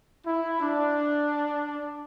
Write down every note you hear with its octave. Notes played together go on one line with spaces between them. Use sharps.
E4
D4